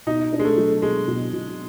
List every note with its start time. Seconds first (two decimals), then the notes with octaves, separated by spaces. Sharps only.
0.07 B2 D#4
0.32 D4
0.39 G#3
0.45 A3
0.57 F#3
0.82 B2 G#3
1.07 B2
1.33 B2